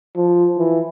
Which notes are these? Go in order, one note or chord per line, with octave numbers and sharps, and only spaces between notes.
F3
E3